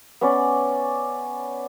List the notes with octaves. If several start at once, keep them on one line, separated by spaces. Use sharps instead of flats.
B3 C#4 D5